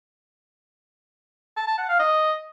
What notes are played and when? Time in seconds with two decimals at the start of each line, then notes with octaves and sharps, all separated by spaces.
1.57 A5
1.68 A5
1.78 F#5
1.89 F5
1.99 D#5